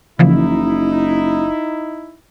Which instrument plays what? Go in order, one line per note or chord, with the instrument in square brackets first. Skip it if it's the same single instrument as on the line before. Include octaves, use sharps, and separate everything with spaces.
[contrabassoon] F#1 [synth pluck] C#3 E3 F3 [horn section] D#4 E4